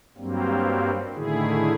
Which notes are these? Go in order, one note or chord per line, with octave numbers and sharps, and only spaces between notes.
G2 F#3 G3 A#3 C4
A2 D3 D#3 E4 G#4